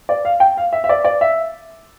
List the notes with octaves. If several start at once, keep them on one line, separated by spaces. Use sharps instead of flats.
D5
F5
G5
F5
E5
E5
D5
D5
E5